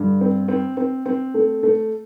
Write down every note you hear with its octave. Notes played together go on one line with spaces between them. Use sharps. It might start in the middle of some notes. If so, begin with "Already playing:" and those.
Already playing: G2 D3
C4
C4
C4
C4
A3
A3